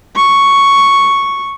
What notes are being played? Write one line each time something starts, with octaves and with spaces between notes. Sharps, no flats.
C#6